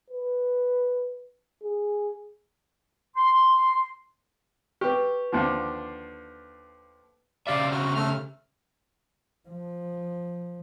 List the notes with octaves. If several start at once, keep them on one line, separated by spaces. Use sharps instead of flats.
B4
G#4
C6
G4 B4 C#6
D#2 D3 F3
C#3 G4 D5 E5 F5
F#4 F6
A3 F6
F3